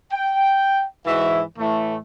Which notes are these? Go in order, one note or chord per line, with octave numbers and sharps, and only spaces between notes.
G5
G#2 E3 F#4 E5
A2 E3 A3